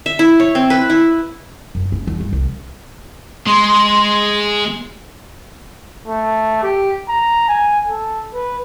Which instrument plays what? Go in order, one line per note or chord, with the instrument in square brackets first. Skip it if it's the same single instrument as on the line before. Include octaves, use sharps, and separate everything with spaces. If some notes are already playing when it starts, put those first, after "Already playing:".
[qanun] E5
E4
C#5
C4
B4
E4
[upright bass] F#2
C#4
E2
G2
C2
[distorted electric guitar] G#3 [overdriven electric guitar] C6
[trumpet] A3
G4
A#5
G#5
A4
B4